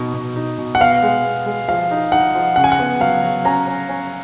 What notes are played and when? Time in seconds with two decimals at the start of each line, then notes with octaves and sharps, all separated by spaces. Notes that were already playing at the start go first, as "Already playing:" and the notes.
Already playing: B2 D#4
0.14 B2
0.36 D#4
0.58 B2
0.75 F#5
0.80 B3 F5
1.03 G#3
1.24 B3
1.46 G#3
1.69 F3 F5
1.91 D#4
2.12 D#4 F#5
2.35 F3
2.56 C#3 F#5
2.64 G#5
2.72 F#5
2.79 B3
3.00 F#3 F5
3.23 F#3
3.45 C#4 A#5
3.67 C#4
3.89 C#4